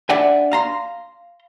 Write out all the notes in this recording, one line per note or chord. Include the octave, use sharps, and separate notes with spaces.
D4 D5 E5 F#5 G#5
F5 A#5 C6